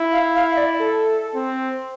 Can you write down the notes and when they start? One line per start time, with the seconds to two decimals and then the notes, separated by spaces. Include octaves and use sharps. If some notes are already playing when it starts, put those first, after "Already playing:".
Already playing: E4
0.12 F5
0.35 F5
0.53 E5
0.57 D5
0.79 A4
1.35 C4